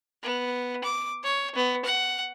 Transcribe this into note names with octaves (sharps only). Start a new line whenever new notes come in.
B3
D6
C#5
B3
F#5